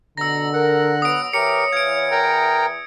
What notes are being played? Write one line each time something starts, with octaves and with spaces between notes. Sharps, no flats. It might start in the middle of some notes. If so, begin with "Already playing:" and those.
B2 D3 A#5 E6 A#6
A#4 F#5
F#3 B3 D#6 D7
E3 G4 A#4 C#5 C#7
E2 E3 F5 G#6 D7
A#4 G5 A#5